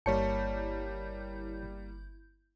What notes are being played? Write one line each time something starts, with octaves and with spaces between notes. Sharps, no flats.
G1 G3 A#3 E4 C#5 A5 G6 C#7